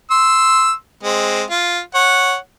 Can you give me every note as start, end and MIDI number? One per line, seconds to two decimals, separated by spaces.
0.11 0.72 84
0.11 0.72 88
1.03 1.43 56
1.03 1.43 60
1.50 1.80 65
1.95 2.36 73
1.95 2.36 78